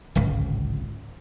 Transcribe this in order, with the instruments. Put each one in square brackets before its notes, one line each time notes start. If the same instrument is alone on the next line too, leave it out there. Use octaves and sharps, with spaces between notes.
[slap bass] D1 G#1 C#2